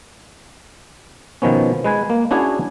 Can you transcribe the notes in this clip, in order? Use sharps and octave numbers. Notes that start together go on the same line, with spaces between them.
B2 D#3 F3 B3 C#4
G#3 B4 G#5
A#3
C#4 D4 E4 F#4 G#4 C#5